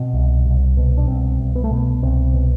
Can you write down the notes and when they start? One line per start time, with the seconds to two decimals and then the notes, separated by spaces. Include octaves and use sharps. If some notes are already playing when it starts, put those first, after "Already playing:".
Already playing: B2 C4
0.13 C2
0.45 C2
0.77 B2
0.97 D4
1.08 C2 C4
1.40 C2
1.55 B3
1.64 A3
1.71 B2 B3
2.02 C2 C4
2.34 B2